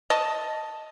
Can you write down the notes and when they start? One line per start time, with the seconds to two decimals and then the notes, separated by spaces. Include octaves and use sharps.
0.10 D#5 A5